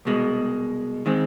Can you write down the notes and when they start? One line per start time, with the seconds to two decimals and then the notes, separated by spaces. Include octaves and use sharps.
0.05 C2 B2 G#3
1.06 D#3 G#3 C4